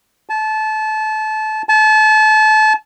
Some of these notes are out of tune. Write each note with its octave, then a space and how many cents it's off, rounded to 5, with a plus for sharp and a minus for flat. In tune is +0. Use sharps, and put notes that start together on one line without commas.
A5 -25
A5 -30